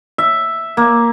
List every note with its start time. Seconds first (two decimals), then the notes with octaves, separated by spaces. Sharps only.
0.18 E5
0.77 A#3